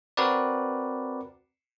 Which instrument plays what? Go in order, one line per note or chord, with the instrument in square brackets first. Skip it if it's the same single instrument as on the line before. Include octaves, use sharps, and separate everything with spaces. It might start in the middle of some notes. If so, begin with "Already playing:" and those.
[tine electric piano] C4 F#4 A#4 B4 D5